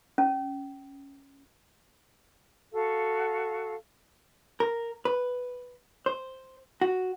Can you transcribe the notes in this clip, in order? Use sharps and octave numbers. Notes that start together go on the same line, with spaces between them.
C#4
F#4 A4 F5
A#4
B4
C5
F#4